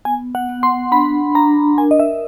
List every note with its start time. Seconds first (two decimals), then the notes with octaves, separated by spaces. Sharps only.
0.05 B3 G#5
0.35 F#5
0.49 B3
0.63 C6
0.91 D4 B5
1.35 D4 A#5
1.78 A#4 G#5
1.91 D#5
2.00 E5